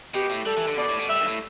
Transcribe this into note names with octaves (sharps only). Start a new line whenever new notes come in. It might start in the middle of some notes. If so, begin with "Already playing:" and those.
B2 G4
A2
G3 A4
E3
D3
B2 D5
A2
B2
G3 E5
G2
A2